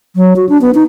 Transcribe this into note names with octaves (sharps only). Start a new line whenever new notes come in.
F#3
F#4
D4
B3
D#4